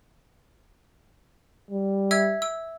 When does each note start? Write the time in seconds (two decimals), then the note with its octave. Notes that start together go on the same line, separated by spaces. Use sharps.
1.71 G3
2.11 E5 E6 G#6
2.42 E6